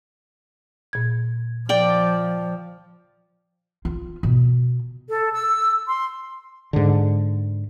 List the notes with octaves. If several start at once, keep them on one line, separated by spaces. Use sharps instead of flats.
A#2 G#6
F3 D5 G5
F4
B2
A4
E6
C6
G#2 D3